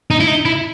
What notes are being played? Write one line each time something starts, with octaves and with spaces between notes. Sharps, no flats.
D#4
E4
D#4
E4